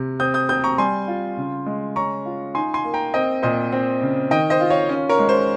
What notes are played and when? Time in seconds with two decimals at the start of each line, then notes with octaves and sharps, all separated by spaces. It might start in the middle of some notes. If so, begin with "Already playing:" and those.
Already playing: C3
0.20 C4 D#6 G6
0.34 D#6 G6
0.49 C4 D#6 G6
0.64 A#5 C#6
0.78 G3 G#5 C6
1.08 F4
1.37 C#3
1.66 G#3
1.96 C#4 A#5 C#6
2.25 F4
2.55 D#4 G#5 C6
2.74 G#5 C6
2.84 A#3
2.94 G5 A#5
3.14 C4 D#5 G5
3.43 A#2 C5 D#5
3.72 C4
4.02 C#3
4.31 D#3 D#5 G5
4.50 C5 D#5
4.60 F4
4.70 C#5 F5
4.89 C#4
5.09 A#4 C#5
5.19 G#3
5.29 C5